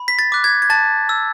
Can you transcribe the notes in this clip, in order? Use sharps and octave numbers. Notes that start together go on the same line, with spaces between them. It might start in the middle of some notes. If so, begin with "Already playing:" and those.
Already playing: B5
B6
A6
D6 F#6
G#6
G#6
A5 A6
E6